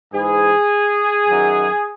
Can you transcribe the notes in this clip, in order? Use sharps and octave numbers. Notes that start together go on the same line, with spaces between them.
G#2 E3 G#4
F#2 D#3 F#3